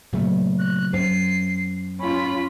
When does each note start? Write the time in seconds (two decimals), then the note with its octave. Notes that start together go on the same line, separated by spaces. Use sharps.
0.13 A#2 C#3 F#3 A3 B3
0.59 F#6
0.93 F#2 C5 C7
1.99 C#4 F4 B5